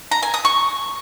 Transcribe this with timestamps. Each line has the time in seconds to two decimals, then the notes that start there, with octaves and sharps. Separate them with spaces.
0.11 A#5
0.23 G#5
0.34 D#6
0.45 C#6